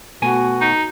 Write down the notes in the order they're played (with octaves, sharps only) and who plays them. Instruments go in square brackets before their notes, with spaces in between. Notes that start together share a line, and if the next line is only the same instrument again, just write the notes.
[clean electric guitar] B2 A3 G#5 [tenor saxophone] F#4
[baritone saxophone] D#4